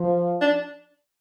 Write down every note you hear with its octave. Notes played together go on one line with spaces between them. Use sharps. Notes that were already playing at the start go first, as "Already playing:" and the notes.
Already playing: F3
D4